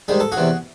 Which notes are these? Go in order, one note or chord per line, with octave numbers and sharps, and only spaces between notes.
G#2 D#3 G3 G#4
A4
F#4 G#4
E2 C3 E3